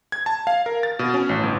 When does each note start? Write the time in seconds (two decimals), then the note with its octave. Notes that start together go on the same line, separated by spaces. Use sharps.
0.12 G#6
0.26 A5
0.47 F5
0.66 A#4
0.83 A6
0.99 B2
1.14 C#4
1.29 A1
1.43 G1